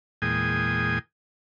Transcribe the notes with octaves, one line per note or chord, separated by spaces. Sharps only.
E2 A#2 G#3 G5 G#5 D#6